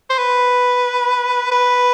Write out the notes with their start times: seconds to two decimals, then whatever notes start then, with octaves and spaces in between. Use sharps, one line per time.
0.10 C5
0.18 B4
1.52 B4